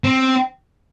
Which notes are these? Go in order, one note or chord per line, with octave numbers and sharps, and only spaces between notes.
C4